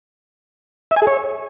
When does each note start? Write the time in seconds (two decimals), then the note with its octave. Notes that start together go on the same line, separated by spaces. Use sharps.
0.91 E5
0.96 G#5
1.02 G#4
1.07 C#5